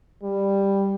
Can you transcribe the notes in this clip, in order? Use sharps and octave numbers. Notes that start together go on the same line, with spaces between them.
G3